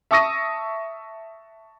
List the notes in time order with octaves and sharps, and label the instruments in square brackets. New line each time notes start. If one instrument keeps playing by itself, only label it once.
[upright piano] E5 A5 C#6 D#6 A#6 D#7